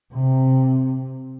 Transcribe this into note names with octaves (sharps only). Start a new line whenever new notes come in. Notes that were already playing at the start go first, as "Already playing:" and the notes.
C3